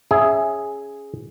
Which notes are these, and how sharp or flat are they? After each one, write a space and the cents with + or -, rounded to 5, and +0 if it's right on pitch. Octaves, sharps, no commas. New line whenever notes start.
C#4 +5 G#4 +0 E5 +0